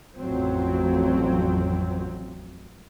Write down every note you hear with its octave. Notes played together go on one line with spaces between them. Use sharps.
A1 F2 F#3 C4